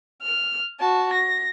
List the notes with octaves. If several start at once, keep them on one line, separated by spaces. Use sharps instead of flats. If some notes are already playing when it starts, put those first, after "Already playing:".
F6
F#4 A5
A#6